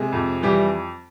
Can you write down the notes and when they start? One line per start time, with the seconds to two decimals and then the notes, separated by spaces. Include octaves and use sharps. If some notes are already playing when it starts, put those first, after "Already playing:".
Already playing: C3 G#3 G#4
0.12 F2
0.42 E3 G3 G4